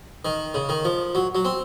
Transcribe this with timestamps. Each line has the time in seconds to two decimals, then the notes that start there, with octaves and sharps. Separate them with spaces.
0.25 D#3
0.54 C#3
0.69 D#3
0.85 F3
1.15 F#3
1.35 F#3
1.45 C4